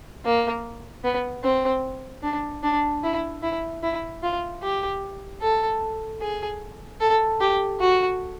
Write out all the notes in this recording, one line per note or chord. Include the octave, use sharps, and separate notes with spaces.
A#3
B3
C4
D4
D4
E4
E4
E4
F4
G4
A4
G#4
A4
G4
F#4